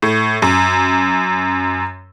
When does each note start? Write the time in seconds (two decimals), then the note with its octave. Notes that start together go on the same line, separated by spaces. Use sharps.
0.02 A2
0.42 F#2